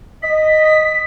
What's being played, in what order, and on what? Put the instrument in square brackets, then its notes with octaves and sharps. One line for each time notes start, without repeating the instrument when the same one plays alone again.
[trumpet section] D#5 [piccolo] B6